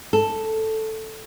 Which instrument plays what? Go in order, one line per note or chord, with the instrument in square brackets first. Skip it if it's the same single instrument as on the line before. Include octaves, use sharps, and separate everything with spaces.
[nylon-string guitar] A4